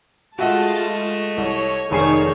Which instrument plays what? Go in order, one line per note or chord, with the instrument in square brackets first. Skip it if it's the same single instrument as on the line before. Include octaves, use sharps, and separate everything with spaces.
[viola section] G#3 F4 A5 [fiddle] A3 D#5 [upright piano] F#4 E5 F#5
[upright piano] C2 [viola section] C#5
[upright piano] F1 G#5 C7 [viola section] D#3 G#4 C#5 [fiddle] A3 C#6